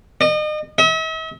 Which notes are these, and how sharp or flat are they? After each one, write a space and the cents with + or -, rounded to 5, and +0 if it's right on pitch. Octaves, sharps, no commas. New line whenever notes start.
D#5 -35
E5 -45